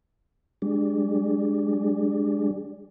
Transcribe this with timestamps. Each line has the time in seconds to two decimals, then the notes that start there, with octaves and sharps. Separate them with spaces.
0.62 G3 G#3 D4